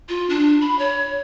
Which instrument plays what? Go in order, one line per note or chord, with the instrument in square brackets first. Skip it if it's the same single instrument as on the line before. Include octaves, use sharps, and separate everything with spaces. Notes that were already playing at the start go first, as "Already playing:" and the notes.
[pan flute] F4
D4
B5
C#5